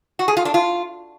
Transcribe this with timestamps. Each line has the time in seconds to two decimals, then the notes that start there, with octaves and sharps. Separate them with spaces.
0.19 F#4
0.28 G#4
0.37 F4
0.45 D4
0.54 F4